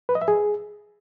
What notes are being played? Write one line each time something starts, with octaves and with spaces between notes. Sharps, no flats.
B4
D#5
E5
G#4